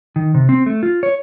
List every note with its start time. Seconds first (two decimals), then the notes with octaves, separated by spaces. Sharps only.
0.16 D#3
0.34 C3
0.49 C4
0.66 A3
0.83 F4
1.03 C#5